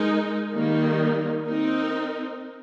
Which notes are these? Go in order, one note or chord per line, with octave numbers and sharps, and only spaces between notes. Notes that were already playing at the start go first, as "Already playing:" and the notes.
Already playing: G#3 D#4 A#4
D#3 G3 A#3 D#4
C4 D#4 A#4